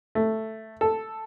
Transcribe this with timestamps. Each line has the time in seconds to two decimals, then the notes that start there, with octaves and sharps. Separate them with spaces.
0.15 A3
0.81 A4